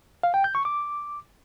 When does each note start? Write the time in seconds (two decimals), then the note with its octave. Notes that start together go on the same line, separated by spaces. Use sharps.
0.23 F5
0.34 G5
0.44 G6
0.55 C#6
0.65 D6